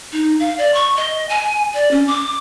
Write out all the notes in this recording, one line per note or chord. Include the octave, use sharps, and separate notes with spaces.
D#4
F5
D5
C#6
D#5
G#5
D5
C#4
D6